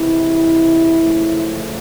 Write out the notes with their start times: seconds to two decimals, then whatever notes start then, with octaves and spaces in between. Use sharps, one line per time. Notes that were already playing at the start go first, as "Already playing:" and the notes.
Already playing: C3 E3 G#3 E4
0.98 F#2 C#3 F3 A3